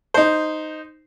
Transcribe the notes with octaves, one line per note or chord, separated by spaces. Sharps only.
D#4 C5